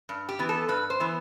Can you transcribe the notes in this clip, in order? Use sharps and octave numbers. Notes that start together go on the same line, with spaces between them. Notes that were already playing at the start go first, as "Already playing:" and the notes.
G2
G4
E3 B3
A4
G2 B4
C5
E3 B3